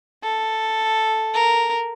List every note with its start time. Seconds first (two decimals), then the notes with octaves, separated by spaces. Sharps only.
0.23 A4
1.34 A#4